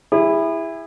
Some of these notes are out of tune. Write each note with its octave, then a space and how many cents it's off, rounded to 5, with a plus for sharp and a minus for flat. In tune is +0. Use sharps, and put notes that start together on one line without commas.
E4 +0 G#4 -40